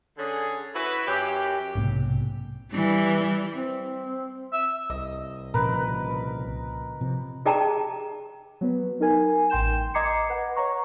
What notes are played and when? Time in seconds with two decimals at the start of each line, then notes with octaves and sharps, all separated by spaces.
0.17 D3 C#4 G#4
0.75 E4 F#4 B4
1.08 F#2 G4
1.75 B1 G#2 C3 A#3
2.72 E3 G3
3.56 C4
4.53 E5
4.90 C2 D#5
5.54 A#2 C#3 F3 A#4 B4
7.01 C3 F3
7.45 G4 G#4 D5 G5 A5 A#5
8.61 F#3 B3 B4
9.00 D#4 A#4 G#5
9.50 A1 G5 C6 G6 E7
9.94 D#5 A#5 D6 G#6 C7 C#7
10.30 B4 F#5
10.56 C#5 F#5 A#5 C#6